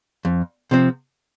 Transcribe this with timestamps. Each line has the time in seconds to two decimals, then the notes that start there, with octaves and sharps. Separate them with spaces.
0.25 F2
0.71 C3 F3 C4